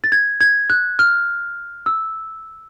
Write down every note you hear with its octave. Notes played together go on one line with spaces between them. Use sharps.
A6
G#6
G#6
F#6
F6
E6